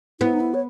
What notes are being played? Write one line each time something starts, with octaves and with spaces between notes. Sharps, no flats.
B3 E4
D#4
E4
C#5